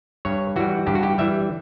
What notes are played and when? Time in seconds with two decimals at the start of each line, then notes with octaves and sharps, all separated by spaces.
0.25 G2 C#5
0.56 E3 G3 F#4
0.87 G2 G4
0.95 F#4
1.03 G4
1.18 E3 G3 E5